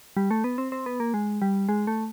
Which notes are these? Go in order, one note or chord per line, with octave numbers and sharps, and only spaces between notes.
G3
A3
B3
C4
C4
B3
A#3
G#3
G3
G#3
A3